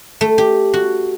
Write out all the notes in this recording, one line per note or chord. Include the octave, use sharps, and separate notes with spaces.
A3
G4
F#4